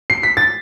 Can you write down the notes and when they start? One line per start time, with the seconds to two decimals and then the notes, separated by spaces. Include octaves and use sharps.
0.10 C7
0.23 B6
0.37 A6